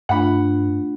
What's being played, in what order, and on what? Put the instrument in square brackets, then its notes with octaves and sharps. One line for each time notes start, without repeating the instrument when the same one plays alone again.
[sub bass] G2 [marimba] A3 D4 F4 [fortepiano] F#5 B5